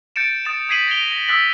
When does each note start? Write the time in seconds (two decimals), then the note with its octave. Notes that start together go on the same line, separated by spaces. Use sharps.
0.16 G6 A6 C#7 D7 E7
0.45 D#6 A6 D7 E7
0.69 D#6 G#6 B6 C7 D#7 F#7
0.87 G#6 A#6 C7 D7 F7 G7
1.12 A#6
1.28 D#6 E6 F#6 A6 B6 F#7